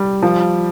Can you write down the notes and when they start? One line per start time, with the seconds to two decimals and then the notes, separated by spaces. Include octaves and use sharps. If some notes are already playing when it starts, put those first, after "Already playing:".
Already playing: G3
0.22 F3